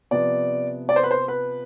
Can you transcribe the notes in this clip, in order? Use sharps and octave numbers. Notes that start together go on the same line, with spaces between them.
C3 F3 B3 D5
D5
C5
B4
C5
B4